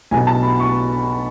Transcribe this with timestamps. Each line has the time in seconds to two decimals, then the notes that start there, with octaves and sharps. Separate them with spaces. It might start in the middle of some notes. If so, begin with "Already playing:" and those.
0.11 B1 B2 G#5
0.27 A5
0.43 B5
0.59 C#6